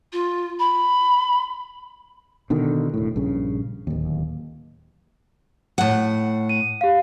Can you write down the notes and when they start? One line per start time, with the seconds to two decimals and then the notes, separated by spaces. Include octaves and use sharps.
0.12 F4
0.59 B5
2.50 B2 D3 D#3
2.94 E1 A2
3.16 A#1 G2 C#3
3.87 D1 D#2
5.78 A2 F#5
6.49 D#7
6.81 G4 F5